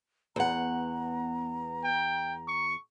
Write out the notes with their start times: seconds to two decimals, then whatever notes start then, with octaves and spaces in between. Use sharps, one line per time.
0.36 E2 B3 F#5 A#5
1.84 G5
2.48 C#6